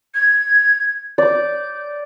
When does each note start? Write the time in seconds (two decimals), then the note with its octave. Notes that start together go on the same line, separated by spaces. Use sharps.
0.14 G#6
1.18 D5 G6